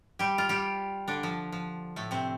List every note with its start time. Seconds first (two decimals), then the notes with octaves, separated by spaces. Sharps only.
0.19 G3 G4
0.38 F4
0.49 G3 G4
1.08 D3 D4
1.23 F3
1.52 F3
1.96 A2 A3
2.11 C3 C4